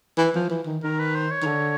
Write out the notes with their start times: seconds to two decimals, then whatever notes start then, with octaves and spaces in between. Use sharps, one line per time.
0.18 E3
0.35 F3
0.50 E3
0.66 D#3
0.83 D#3 A#4
0.99 B4
1.15 C5
1.31 C#5
1.42 D#3
1.47 D3